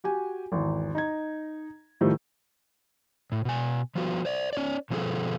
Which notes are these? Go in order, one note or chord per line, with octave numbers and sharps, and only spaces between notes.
F#4 G4 G#5
G#1 E2
D#4 A#5 G#6
A2 D#3 F3 G3 A3
A2
B2 G#5
F3 G3 B3 F#4
C5 D5
C#4 C#5 D5
B2 F3 C4 C#4 G#4 A4